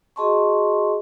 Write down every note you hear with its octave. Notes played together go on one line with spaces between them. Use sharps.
F#4 G#4 D#5 A5 C6 C#6